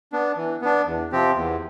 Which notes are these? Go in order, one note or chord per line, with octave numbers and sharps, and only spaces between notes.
B3 D4
E3
B3 D4
E2
C3 F3 C4 G4
E2